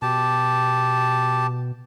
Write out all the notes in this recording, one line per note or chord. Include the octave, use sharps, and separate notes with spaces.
B2 G4 A5